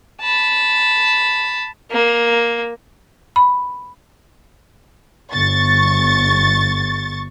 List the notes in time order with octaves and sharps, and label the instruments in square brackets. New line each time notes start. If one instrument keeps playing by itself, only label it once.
[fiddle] A5 B5
[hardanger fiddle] A#3
[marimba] B5
[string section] G1 C#6 A6